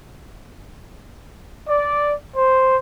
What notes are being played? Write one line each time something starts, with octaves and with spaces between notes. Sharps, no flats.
D5
C5